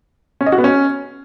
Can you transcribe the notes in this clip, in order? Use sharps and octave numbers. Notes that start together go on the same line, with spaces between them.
C#4
D#5
F#4
B3
C#4